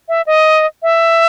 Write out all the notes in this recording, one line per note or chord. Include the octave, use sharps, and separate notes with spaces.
E5
D#5
E5